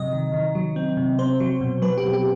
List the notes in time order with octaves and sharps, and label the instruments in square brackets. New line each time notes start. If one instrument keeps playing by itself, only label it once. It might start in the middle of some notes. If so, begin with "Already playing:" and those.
Already playing: [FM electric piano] C3 F#3 D#5
D#3
D#3
F#3
C4
C3
C4 C5
F#3
B2
F#3 B4
G4
B2
G4